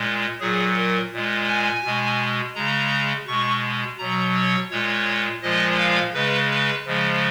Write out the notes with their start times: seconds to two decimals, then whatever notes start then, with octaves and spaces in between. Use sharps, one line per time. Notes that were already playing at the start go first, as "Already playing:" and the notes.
Already playing: A#2 G#3
0.40 A#2 F#3 G#4
0.76 A#4
1.12 A#2 G#3
1.48 G#5
1.84 B2 G#3
2.55 C#3 G#3 A#5
3.27 B2 G#3 C#6
3.98 B2 F#3 A#5
4.34 C#5
4.71 A#2 G#3 C#5
5.42 A#2 F3 G#3 D#5
5.78 F5
6.13 C#3 G#3 B4
6.50 B4
6.86 C#3 F3 G#3